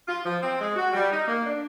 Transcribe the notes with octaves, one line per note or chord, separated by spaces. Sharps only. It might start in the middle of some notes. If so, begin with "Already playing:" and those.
F4
F3
C4
G#3
F#4
G3
D#4
A#3
D4